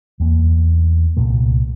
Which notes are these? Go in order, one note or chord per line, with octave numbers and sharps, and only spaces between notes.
E2 A#3
C2 A#2 A3